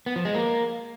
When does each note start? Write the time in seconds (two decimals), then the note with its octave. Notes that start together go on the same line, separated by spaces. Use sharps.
0.06 B3
0.16 F3
0.25 G#3
0.34 A#3